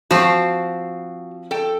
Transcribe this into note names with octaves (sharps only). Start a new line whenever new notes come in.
F3 C4 F#4 F5
A4 G5